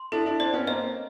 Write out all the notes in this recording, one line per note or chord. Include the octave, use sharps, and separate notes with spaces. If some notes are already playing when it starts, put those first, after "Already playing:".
Already playing: C6
D4 E4 A4
D4 E4
C4 D4 D5
B3 C#4
A#3 C4 D#5